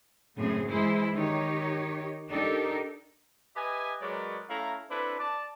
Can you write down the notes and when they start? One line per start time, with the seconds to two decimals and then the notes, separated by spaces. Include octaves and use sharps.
0.37 F#2 A2 C#3 C4 G#4
0.71 E3 G#3 E4 G#4 C5
1.16 D#3 D#4 G4 C#5
2.30 D4 D#4 G4 A4 A#4
3.56 G4 B4 D#5 E5 G#5
4.01 F#3 G#3 A#4 B4 C#5 D5
4.49 A3 C#4 E4 F5 A#5
4.90 C4 D4 E4 A4 B4
5.19 D5 A5